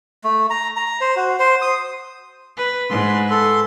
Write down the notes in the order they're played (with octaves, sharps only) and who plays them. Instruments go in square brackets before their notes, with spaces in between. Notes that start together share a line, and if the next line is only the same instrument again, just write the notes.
[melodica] A3
A#5
A#5
C5
F#4
C5
D#6
[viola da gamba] B4
[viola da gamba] G#2 B4 [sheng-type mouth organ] C6
[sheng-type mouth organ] A4 C6